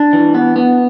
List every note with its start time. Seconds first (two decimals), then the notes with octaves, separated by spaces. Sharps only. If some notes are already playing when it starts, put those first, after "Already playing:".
Already playing: D4
0.13 E3
0.35 B3
0.56 B3